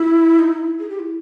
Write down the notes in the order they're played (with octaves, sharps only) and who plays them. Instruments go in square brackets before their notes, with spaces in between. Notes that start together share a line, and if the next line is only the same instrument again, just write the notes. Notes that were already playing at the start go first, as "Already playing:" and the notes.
Already playing: [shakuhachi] E4
D#4
E4
G#4
G4
E4